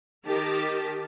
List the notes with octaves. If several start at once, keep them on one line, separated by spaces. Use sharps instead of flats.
D#3 D#4 G4 A#4 A5